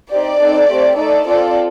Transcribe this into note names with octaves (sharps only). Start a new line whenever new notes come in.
C4 D#4 G4 D5
C4 D#4 A4
A3 C4 G4
A3 D#4 A4 D5
C4 F4 A4 D5